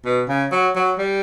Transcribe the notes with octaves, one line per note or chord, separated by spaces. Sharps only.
B2
C#3
F#3
F#3
G3